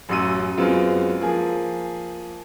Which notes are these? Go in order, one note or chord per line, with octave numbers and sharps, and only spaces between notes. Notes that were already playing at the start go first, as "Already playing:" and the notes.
A1 F#2 C6 E6 D#7
F#2 G#3 B3 C4 F4
F3 A#3 G#4